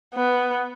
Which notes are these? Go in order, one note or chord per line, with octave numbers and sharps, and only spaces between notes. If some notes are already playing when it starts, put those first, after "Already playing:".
B3